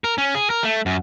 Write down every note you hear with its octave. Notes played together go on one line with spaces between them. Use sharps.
A#4
C#4
G#4
A#4
A3
F#2